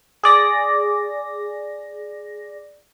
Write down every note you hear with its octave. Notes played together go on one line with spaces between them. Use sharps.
G#4 D5 A#6